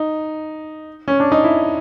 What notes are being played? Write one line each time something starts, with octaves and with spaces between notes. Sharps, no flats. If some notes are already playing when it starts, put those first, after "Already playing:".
Already playing: D#4
C#4
D4
D#4
E4